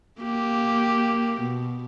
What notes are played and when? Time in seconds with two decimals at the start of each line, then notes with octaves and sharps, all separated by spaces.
0.20 A#3 G4
1.41 B2